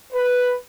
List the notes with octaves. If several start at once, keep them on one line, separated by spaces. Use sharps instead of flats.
B4